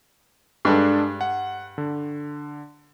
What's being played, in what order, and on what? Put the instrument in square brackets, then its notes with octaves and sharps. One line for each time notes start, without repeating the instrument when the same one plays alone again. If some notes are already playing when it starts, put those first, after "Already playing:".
[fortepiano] G2 [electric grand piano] G#3 D4 A4
[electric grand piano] F#5
D3